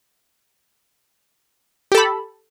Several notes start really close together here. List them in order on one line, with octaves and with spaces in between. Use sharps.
G4 A4 B5